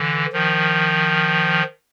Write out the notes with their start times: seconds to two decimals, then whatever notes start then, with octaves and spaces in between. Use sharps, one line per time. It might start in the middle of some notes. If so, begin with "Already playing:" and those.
Already playing: D3 E3
0.33 D#3 F3